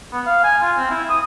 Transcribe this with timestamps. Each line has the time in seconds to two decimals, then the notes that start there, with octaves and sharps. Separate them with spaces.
0.13 B3
0.26 F5
0.43 G#5
0.61 F4
0.77 C4
0.90 E4
1.09 D#6